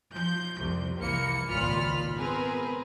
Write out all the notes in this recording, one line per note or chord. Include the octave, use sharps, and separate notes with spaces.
F3 G6
C2 F2 C3
C2 E3 A#3 C#7
G#1 C#2 A#2 F4 B5 F6
B3 C4 G#4 A#4 B4